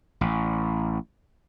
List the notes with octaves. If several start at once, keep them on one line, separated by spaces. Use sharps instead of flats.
A1